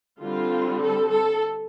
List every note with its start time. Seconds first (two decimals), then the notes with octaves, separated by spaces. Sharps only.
0.21 D3 G3 C4 F4
0.81 A4
1.11 A4